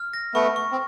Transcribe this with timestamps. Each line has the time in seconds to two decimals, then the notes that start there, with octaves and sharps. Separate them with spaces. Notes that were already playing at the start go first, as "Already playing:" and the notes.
Already playing: F6
0.13 A#6
0.34 A3 B3 C#6
0.56 C#6
0.72 C4